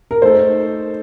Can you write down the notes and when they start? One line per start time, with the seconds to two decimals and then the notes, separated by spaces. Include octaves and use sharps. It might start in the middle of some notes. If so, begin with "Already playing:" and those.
0.11 A#4
0.22 A3 D#4 A4 C5